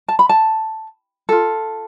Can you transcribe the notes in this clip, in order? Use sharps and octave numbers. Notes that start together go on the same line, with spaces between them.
A5
B5
A5
F4 A4